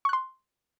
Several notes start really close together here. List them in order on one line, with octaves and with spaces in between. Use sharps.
C#6 F#6 C6